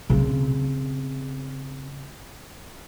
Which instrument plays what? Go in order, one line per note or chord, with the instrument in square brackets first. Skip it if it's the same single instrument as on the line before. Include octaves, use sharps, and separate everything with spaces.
[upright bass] C#3 C4